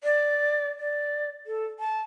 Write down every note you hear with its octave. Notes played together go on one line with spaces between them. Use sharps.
D5
D5
A4
A5